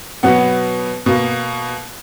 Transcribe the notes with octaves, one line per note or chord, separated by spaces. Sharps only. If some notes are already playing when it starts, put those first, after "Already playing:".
B2 F#3 B3 F#5
B2 A#3